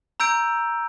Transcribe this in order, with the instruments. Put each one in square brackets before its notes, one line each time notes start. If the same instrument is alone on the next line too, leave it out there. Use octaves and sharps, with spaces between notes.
[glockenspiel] A#5 E6 G6 D7